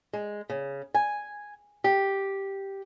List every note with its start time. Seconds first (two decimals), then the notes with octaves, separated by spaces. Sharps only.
0.13 G#3
0.50 C#3
0.94 G#5
1.84 G4